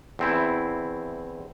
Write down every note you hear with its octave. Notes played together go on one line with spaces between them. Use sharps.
E2 C4 E4